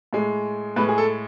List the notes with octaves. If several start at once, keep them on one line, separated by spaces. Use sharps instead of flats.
A2 G#3
A2 G#3 B4
G#4
A4